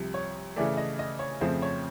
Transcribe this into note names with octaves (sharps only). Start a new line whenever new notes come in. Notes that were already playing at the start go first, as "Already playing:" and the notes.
Already playing: C2 C3 F3
C#5
C#3 E3 A3 D5
D#5
D#5
C#5
F2 C#3 F3 A3 C4 C5
C#5